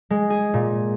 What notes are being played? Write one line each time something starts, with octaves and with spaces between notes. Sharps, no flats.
G#3
G#4
A#2